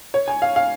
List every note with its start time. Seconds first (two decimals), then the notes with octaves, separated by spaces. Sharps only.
0.14 C#5
0.28 G#5
0.42 F5
0.56 F5